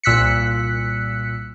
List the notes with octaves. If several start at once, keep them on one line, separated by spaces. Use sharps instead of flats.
C2 A#2 E6 F#6 B6 C#7